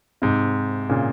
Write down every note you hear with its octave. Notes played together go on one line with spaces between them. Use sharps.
G#2 C3
A#2 C#3